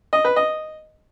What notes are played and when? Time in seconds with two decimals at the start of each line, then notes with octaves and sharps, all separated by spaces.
0.13 D#5
0.25 B4
0.36 D#5